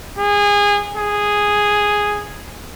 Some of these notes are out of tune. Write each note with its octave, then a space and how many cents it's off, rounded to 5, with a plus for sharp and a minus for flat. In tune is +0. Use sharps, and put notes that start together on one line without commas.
G#4 -25
G#4 -5